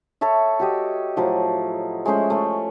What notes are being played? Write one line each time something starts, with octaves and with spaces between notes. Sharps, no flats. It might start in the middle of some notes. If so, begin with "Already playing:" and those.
A4 C#5 E5
F#4 G4 D#5
A2 F3 F#3
G#3 A3 C#4 C5
A3 C#4